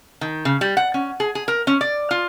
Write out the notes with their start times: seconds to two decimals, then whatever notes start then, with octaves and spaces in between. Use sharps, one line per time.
0.21 D#3
0.45 C#3
0.61 G3
0.77 F#5
0.94 C#4
1.20 G#4
1.35 G#4
1.48 A#4
1.67 C#4
1.81 D5
2.11 F4